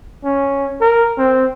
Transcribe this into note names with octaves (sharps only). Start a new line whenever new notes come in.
C#4
A#4
C4